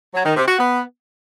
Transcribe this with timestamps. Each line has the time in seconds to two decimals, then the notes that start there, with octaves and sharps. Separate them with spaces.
0.14 F#3
0.25 D#3
0.36 C3
0.48 F#4
0.59 B3